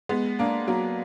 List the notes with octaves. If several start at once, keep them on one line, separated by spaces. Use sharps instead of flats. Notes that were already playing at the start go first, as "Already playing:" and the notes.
G#3 B3
A#3 D4
F#3 A#3